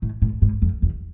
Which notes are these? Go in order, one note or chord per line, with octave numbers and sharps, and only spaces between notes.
A2
A2
G#2
F2
E2